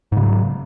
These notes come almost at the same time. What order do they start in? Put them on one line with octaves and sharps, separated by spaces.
G#2 C#3 F#3